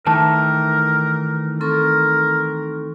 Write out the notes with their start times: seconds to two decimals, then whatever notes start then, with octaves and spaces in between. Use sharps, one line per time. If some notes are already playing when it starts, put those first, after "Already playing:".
0.06 D#3 E3 A3 A#4 A5
1.61 C4 A4 A#4 C#6